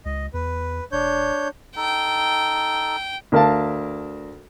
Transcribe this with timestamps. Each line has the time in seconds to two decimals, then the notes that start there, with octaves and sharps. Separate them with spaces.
0.05 C#2 D#5
0.34 E2 B4
0.92 E1 D4 C#5 G6
1.76 D#4 A4 G5
3.32 D2 A#4 F5 A5